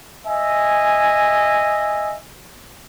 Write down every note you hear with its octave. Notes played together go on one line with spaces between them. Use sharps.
D#5 E5 G#5